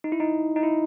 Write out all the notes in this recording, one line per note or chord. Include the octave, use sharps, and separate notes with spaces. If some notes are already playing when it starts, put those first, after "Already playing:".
D#4
E4
D#4
D#4
E4